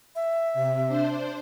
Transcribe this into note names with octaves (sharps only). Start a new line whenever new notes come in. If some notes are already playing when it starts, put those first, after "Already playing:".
E5
C3
D4 C5